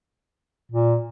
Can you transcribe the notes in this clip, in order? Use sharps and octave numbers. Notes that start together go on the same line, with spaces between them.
A#2